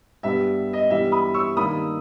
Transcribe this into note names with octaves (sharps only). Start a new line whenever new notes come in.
G2 G3 B3 E5
D#5
G2 E3 G3 B3 E5
B5 D#6
C#6 E6
G2 D#3 A#3 B5 D#6